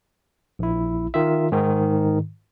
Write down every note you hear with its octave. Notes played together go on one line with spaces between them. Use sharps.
A#1 E4
D#3 F4 E5
G#2 D#3